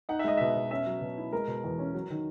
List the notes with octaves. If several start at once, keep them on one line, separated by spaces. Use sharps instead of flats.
D#4 F#5
E5
G#3 D#5
B2 E5
B2
C#4 E5
F#3
B2
E4
G#3 A#4
B2
E2
C#4
F#3
D#3